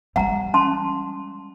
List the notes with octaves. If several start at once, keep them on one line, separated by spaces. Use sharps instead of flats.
G3 G#3 F#5 A#5
C#4 A5 C6